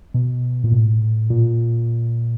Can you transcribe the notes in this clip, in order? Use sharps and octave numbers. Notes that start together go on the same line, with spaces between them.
B2
A#2
A2
A#2